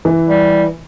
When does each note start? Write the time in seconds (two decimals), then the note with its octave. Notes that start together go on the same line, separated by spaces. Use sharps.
0.05 E3
0.28 G3